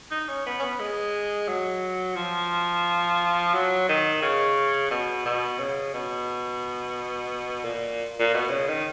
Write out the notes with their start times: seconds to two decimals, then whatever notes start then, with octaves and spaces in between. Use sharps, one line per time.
0.11 D#4
0.29 C#4
0.46 B3
0.59 C#4
0.62 B3
0.80 G#3
1.48 F#3
2.16 F3
3.54 F#3
3.89 D#3
4.22 C#3
4.91 B2
5.26 B2
5.59 C#3
5.94 B2
7.64 A#2
8.20 A#2
8.34 B2
8.50 C#3
8.68 D#3